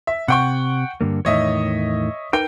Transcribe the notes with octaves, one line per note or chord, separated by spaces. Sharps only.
E5
C3 F#5 G5 C#6
G2 D3 A#3
E2 A2 D#3 C#5 D#5 E5
D#4 A#4 B4 G5